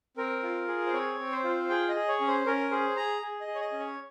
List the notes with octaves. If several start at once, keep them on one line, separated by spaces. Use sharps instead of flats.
C4 A#4
F4
G#4
C5
C4 C#5
C4
C5
F4
G#4 G5
D#5
G#4
C#5
C#4
C5
C#4 A#4
G#4 C5
G#4 A#5
G#4
D#5
G#4
C#5
D#5
C#4
C#5